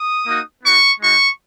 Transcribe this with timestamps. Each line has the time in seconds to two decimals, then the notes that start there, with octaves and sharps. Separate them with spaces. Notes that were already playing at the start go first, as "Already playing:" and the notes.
Already playing: D#6
0.26 A#3 D#4 F#4
0.64 B3 D#4 F#4 C#6
1.00 G#3 D#4 F#4 C#6